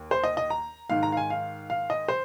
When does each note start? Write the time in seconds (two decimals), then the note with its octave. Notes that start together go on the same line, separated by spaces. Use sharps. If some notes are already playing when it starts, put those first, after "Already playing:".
Already playing: D#2
0.11 C5
0.24 D#5
0.37 D#5
0.50 A#5
0.90 G#2 D#3 F5
1.03 A#5
1.12 F5
1.17 G#5
1.30 F5
1.70 F5
1.90 D#5
2.08 C5